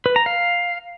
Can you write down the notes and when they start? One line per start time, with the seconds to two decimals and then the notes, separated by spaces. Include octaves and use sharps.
0.06 B4
0.16 A#5
0.26 F5